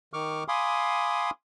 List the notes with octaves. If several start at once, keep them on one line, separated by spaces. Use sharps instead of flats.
D#3 C#6 D6 F6
F5 G#5 B5 C6 D6 D#6